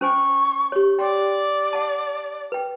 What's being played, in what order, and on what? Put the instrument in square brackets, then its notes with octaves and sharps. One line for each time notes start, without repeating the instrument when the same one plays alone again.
[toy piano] C#4 C5 G#5 [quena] C#6
[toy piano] G4 C#5
[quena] D5 [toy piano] G5 C6
[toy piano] F#5 A5
B4 G5